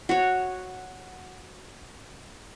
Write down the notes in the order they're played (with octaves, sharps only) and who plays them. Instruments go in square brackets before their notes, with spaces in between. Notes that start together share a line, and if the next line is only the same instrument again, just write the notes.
[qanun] F#4 C#5